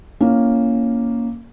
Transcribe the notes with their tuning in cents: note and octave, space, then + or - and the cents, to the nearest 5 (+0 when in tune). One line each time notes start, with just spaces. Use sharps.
A#3 +0 C#4 +0 E4 +30